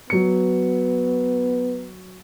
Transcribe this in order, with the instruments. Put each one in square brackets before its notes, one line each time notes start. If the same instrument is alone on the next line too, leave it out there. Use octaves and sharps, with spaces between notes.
[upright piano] F#3 C#7 [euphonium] B3